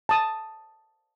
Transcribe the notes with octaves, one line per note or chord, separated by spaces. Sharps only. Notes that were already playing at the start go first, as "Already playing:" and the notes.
A5 D#6